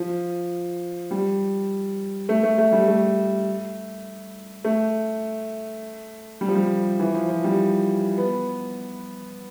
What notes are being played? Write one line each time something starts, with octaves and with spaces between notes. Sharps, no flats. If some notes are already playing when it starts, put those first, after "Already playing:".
Already playing: F3
G3
A3
A3
A3
G3
A3
A3
G3
F3
G3
E3
F3
F3
G3
B3